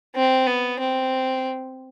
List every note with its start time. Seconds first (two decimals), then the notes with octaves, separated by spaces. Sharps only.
0.16 C4
0.47 B3
0.80 C4